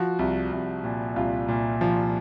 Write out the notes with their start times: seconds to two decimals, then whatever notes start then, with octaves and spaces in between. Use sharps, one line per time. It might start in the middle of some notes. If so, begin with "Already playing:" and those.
Already playing: F3 F#4
0.19 C2
0.52 C2
0.84 A#2
1.16 C2 F4
1.48 A#2
1.81 F3